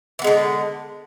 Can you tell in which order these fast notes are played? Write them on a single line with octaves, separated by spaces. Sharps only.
E3 B3 G#3 D3